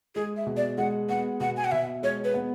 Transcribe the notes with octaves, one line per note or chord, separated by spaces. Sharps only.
G#3 G#4
E5
B2
D5
G#3 F#5
B3 F#5
B2 F#5
G#5
F#5
B2 E5
G#3 C#5
B4
B3